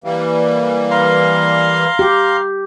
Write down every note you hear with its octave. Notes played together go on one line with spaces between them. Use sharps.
E3 G3 A#3
F5 A#5 C6
G4